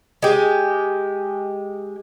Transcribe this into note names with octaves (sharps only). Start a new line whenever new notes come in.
G#3 G4